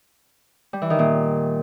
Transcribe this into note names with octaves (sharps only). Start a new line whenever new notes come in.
G3
E3
D#3
A#2